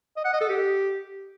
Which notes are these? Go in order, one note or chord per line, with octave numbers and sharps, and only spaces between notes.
D#5
F#5
D#5
A4
G4